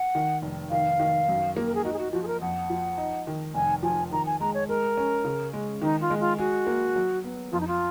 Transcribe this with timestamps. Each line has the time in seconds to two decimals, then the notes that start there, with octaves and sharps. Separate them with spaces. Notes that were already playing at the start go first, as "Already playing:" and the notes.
Already playing: F#5
0.15 D#3
0.42 F1
0.71 D#3 F5
1.00 D#3
1.29 F#2
1.57 A#3
1.66 A#4
1.75 G#4
1.85 D#4 F#4
1.93 G#4
1.99 F#4
2.13 F3 F#4
2.23 G#4
2.27 A#4
2.41 F2 F#5
2.70 F3
2.98 D#4
3.27 D#3
3.54 F1 G#5
3.83 F3 G#5
4.12 D#3 A#5
4.26 G#5
4.40 G#3 A#5
4.54 C#5
4.69 G#3 A#4
4.97 C#4
5.25 C#3
5.53 G#3
5.82 D#3 D#4
6.01 F4
6.10 G#3
6.20 F4
6.39 F#4 G#4
6.67 A#3
6.96 F#3
7.24 B3
7.52 F2 F4
7.60 D#4
7.68 F4